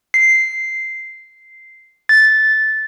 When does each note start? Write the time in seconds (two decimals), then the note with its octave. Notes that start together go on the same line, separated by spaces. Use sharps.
0.14 C7
2.09 A6